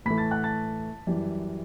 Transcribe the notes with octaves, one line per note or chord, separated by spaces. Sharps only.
A2 E3 A3 B5 B6
A5 A6
F#5 F#6
A5 A6
F#2 E3 G3